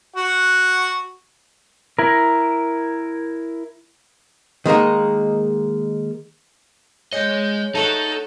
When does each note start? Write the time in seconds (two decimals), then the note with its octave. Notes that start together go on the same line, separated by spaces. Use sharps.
0.16 F#4 F#5
1.99 E4 A#4
4.66 D#3 G#3 A#3 D#4
7.13 G#3 G#4 C#5 D#5 F#5 G6 A#6
7.75 A3 D#4 F#4 A4 F#5